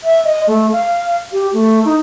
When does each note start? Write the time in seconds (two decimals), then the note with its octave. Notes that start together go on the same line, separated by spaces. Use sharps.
0.04 E5
0.25 D#5
0.48 A3
0.72 F5
1.32 G4
1.53 A3
1.85 D#4